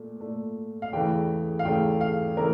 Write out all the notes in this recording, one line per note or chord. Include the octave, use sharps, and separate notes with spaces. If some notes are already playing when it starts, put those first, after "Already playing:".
Already playing: A#2 A3
A#2 A3
F5
E2 C#3 E3 A3 G5
F5
E2 C#3 E3 A3 G5
F5
C#3 E3 A3 A#4